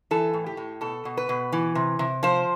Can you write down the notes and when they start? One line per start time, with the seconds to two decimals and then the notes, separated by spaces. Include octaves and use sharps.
0.11 E3 A4
0.34 A2
0.46 G4
0.57 A2
0.81 B2 A4
1.05 B2
1.17 B4
1.29 B2
1.52 E3
1.75 C3
1.99 C3
2.23 F3 C5